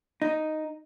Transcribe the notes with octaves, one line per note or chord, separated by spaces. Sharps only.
D#4